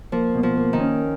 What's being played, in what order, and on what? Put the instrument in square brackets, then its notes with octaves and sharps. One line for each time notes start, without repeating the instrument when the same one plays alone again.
[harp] F3 [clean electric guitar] A#3
[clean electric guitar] B2
[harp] F3
[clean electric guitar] A#3
[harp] D#3
[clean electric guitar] C#4